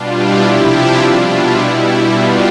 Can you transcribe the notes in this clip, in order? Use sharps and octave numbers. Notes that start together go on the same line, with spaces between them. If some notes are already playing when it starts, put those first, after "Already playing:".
Already playing: B2 G3 D4 F4
E4 G4
C3 F3 E4 G4
D4 F4
B2 G3 D4 F4
E4
B2 G3
B2 G3 D4 F4